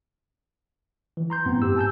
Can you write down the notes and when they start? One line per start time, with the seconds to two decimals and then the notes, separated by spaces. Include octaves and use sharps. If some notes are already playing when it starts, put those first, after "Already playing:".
1.17 E3
1.30 A#5 C6 G6
1.46 F#2 A2 B3 C4
1.62 G#2 G4 E6
1.76 G#5 A5 E6 G6